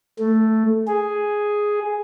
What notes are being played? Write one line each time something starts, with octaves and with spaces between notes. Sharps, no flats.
A3
G#4